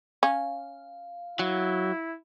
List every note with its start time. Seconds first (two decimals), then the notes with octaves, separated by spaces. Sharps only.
0.23 C#4 F5
1.39 F#3 E4